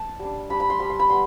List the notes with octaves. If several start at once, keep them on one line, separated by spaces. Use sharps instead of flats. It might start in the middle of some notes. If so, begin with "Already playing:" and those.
Already playing: A5
G3 D4
G3 D4 B5
B5
C6
G3 D4 B5
C6
B5
G3 B3 C6